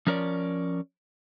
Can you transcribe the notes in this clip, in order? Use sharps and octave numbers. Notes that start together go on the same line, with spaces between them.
F3 C#4 A#4 C#5 D5